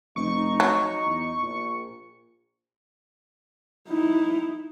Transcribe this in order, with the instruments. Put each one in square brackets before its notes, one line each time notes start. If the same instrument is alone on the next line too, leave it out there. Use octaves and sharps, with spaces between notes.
[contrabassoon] F1 [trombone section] D#4 [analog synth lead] C#6
[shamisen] F#3
[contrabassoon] E2
[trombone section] A#1 [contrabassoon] A#2
[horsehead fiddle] D#4 E4